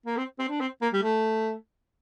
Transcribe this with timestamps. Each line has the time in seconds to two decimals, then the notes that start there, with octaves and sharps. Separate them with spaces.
0.06 A#3
0.17 C4
0.39 C4
0.49 D4
0.60 C4
0.82 A#3
0.93 G3
1.03 A3